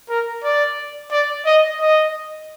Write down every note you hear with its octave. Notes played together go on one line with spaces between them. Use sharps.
A#4
D5
D5
D#5
D#5